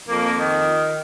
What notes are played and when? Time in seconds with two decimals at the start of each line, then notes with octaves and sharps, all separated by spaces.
0.08 F2 A#3
0.38 D#3